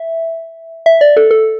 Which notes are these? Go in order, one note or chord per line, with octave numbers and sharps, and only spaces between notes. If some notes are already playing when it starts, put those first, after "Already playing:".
Already playing: E5
E5
D5
A4
A4